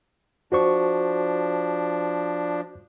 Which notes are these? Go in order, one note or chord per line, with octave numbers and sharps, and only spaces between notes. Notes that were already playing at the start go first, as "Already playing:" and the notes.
F3 D4 F#4 C5 C#6